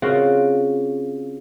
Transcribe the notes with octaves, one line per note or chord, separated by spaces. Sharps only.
C#3 C4 F4 F#4